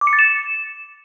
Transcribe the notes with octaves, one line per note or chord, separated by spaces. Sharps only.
D6
C#7
A6
E7